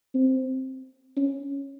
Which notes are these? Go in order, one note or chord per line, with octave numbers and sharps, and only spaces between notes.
C4
C#4